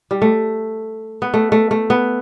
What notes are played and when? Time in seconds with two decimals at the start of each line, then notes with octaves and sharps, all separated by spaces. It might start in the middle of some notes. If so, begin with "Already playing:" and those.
0.11 G3
0.22 A3
1.22 B3
1.34 A3
1.52 A3
1.71 A3
1.90 B3